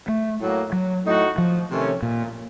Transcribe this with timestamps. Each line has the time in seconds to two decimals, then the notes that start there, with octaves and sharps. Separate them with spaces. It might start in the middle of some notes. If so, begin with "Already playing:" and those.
0.08 A3
0.40 A2 F#3 A#3
0.72 F#3
1.05 A2 A3 D#4 F#4
1.38 F3
1.71 C3 D#3 A3 C#4
2.02 A#2